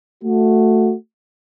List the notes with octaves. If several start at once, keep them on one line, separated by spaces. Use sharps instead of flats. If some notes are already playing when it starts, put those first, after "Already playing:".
A3 F#4